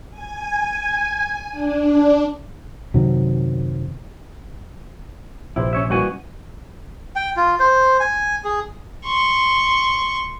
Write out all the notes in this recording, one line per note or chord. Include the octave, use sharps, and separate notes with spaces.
G#5
D4
F#2 C3 D#3 F#3
A#1 C3 E4 G4 C5
C#4 C#5 E5
E3 G3 A#3 C#4 F#4 G#5
G5
F4
C5
G#5
G#4
C6 C#6